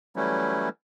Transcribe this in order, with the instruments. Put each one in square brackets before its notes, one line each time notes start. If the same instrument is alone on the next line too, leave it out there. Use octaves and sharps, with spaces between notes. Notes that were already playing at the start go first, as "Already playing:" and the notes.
[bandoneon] E3 F#3 G3 A3 C#4 E4